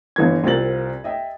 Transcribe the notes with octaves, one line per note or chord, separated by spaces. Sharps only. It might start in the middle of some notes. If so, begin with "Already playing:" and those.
G1 E3 E4 G#6
C2 C4 F4 A#4 A6 F#7
D#5 E5 G5